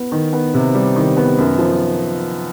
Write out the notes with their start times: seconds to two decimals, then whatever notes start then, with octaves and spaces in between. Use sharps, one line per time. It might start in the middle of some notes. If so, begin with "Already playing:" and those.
Already playing: B3
0.12 D#3
0.33 B3
0.54 C3
0.75 G3
0.96 D#3
1.17 B3
1.38 F#2
1.59 F3